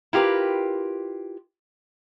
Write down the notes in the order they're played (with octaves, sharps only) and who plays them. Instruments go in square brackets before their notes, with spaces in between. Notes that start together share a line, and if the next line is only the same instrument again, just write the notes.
[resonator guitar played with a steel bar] E4 F4 G4 A#4 B4